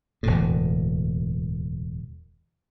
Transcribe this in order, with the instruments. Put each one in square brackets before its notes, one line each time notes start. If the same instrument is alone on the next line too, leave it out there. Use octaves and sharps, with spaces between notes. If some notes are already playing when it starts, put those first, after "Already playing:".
[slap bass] E1 D2 A2